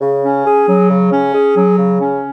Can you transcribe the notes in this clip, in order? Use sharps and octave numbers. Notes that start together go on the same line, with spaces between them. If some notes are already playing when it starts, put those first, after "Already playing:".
C#3
C#4
G#4
F#3
C#3
C#4
G#4
F#3
C#3
C#4